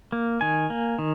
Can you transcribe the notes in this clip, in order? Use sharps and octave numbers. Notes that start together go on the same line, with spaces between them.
A#3
D#3 G#5
A#3
D#3